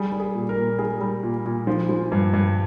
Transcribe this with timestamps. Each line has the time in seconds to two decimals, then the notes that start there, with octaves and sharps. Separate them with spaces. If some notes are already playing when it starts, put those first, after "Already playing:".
Already playing: G3 G#4
0.12 G3
0.20 G#4
0.35 A#2
0.49 A#4
0.56 A#2
0.79 G3 G#4
1.01 G3
1.23 A#2
1.45 A#2
1.67 F3
1.89 F3
2.12 G2
2.33 G2